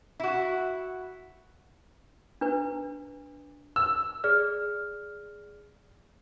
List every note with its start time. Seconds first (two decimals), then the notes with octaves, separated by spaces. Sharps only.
0.20 E4 F#4
2.41 D4 B4
3.76 E6
4.24 G#4 D5 F6